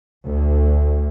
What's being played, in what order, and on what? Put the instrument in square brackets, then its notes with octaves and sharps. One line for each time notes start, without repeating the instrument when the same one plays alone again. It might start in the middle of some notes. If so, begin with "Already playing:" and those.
[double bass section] D2